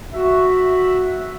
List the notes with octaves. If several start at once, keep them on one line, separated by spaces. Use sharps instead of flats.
F#4 E5